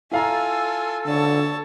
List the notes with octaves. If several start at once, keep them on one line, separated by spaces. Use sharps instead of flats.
E4 F4 A4 F5 G#5 A#5
D3 C#5 A5